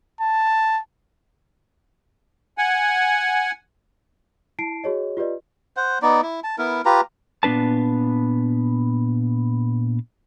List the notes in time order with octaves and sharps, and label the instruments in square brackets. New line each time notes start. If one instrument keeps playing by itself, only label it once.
[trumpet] A5
[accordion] F#5 G#5
[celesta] E4 A5 C7 D7
F#4 G#4 C#5 D#5
F4 G4 B4 D5 D#5
[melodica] C5 F#5
B3 D#4 D5
E4
A5
B3 E4 A#4
F4 G4 B4 A#5
[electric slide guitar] A#2 B3 D4 B4 A5